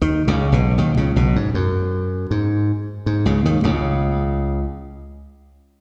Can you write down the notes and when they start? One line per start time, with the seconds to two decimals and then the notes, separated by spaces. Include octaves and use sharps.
0.01 D#2 D#3
0.27 C#2 C#3
0.52 B1 B2
0.78 D#2 D#3
0.97 C#2 C#3
1.16 B1 B2
1.36 G#2
1.54 F#2
2.31 G#2
3.06 G#2
3.26 C#2 C#3
3.45 D#2 D#3
3.63 C#2 C#3